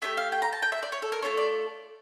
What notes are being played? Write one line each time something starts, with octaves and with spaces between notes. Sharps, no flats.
A3 D4 G4 E5
F5
G5
A#5
A5
G5
E5
D5
C#5
A4
A#4
A3 D4 F4 A4 C#5
D5